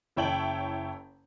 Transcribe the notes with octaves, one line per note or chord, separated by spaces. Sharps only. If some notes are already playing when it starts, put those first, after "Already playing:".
F#1 E4 C#5 G5 A5 F#7